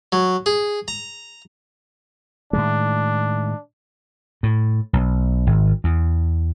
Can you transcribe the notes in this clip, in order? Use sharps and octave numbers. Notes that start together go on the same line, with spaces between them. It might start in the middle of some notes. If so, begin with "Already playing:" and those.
F#3
G#4
A#5
A2 D#3 G#3 D4
A2
B1
G#1
E2